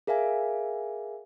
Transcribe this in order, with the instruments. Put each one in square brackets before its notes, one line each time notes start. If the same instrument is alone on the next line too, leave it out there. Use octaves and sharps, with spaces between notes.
[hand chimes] G#4 A#4 E5 F5 G#5